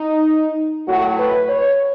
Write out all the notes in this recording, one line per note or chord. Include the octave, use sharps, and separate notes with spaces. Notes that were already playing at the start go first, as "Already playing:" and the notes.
Already playing: D#4
A2 F#3 A3 F#4
B4
C#5